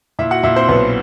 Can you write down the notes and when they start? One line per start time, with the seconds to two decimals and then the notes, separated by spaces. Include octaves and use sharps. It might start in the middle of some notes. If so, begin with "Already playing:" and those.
0.19 A#2 E4 E5
0.31 F#4 F#5
0.43 A#2 E4 E5
0.56 C4 C5
0.68 B1 B3 B4